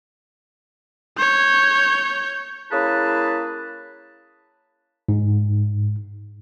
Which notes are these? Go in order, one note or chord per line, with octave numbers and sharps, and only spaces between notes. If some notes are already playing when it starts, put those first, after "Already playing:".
C#5 G6
A#3 C#4 E4 G#4 B4 A5
G#2